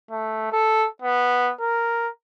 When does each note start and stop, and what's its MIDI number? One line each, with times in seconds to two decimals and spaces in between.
0.11 0.52 57
0.52 0.87 69
1.02 1.52 59
1.60 2.09 70